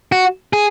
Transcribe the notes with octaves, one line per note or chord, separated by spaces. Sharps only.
F#4
G#4